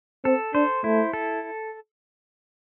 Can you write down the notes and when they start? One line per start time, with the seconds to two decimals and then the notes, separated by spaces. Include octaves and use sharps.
0.25 C4 A4
0.54 D4 C5
0.83 A3 E4
1.13 A4